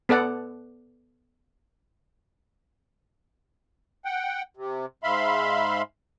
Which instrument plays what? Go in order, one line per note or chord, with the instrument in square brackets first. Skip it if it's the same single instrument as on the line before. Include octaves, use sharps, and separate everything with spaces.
[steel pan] B3 A4 D5 F#5
[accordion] F#5 G5
C3
G#2 E5 F5 B5 C6